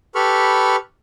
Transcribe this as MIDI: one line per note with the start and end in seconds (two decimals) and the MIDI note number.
0.15 0.76 67
0.15 0.76 69
0.15 0.76 71
0.15 0.76 83
0.15 0.76 85
0.15 0.76 89